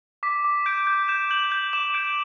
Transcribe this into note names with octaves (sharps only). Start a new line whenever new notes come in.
D6 B6
D6
G6 D7
G6
G6 E7
G6 F#7
G6 F#7
D6 E7
G6 D7